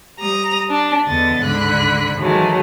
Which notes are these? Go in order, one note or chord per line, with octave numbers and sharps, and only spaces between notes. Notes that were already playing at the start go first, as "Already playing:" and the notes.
G3 A#5 D#6
D4
E2 D3 B3 D#5 A6
D2 G#2 D3 B5 F#6
D#3 E3 F#3 G#3 A3